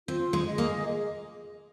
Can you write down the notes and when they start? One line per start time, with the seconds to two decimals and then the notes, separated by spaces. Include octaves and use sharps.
0.08 C4 F4
0.33 G#3
0.45 G#4 D#5
0.58 A#3